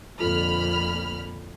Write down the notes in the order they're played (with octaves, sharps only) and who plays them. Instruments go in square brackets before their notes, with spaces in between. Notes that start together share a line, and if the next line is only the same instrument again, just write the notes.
[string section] F2 A#2 D3 [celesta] F4 A4 [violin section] B5 F6